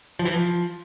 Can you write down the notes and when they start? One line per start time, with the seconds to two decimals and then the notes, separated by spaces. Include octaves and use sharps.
0.19 F3
0.25 E3
0.31 F3